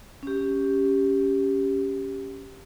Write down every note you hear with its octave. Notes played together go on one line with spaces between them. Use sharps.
C#4 G4